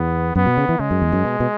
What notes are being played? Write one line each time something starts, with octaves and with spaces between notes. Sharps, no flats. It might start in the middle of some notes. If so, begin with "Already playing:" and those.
Already playing: E2 B3
F#2 B3
B2
C#3
E3
C#3 G#3
F#2
E2
F#2
B2
B2